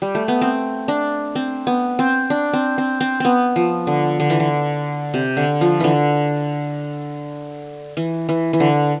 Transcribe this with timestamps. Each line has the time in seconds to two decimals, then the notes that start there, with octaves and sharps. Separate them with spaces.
0.02 G3
0.15 A3
0.28 B3
0.41 C4
0.88 D4
1.35 C4
1.67 B3
1.99 C4
2.30 D4
2.53 C4
2.78 C4
3.01 C4
3.20 B3 C4
3.56 F3
3.87 D3
4.20 D3
4.30 E3
4.40 D3
5.14 C3
5.37 D3
5.61 F3
5.80 D3 E3
7.97 E3
8.29 E3
8.53 E3
8.60 D3